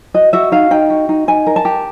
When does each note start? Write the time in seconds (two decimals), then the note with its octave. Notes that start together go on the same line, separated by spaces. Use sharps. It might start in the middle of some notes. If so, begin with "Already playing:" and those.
0.14 F#4 D#5
0.33 F#4 E5
0.52 D#4 F5
0.71 D#4 G5
0.90 F#4
1.09 D#4
1.28 D#4 G#5
1.47 A#4
1.56 A5
1.65 G4